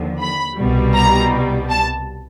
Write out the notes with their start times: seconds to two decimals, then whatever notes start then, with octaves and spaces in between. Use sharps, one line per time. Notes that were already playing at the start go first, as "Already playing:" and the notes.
Already playing: D#2 D3 F3
0.21 B5
0.57 C2 B2 G3
0.95 A#5
1.70 A5